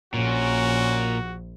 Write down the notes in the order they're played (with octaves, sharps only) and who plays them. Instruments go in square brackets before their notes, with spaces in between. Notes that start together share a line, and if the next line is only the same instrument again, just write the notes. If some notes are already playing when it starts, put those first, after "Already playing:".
[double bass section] A#1 [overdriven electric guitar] A#2 [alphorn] C#4 [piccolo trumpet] F#4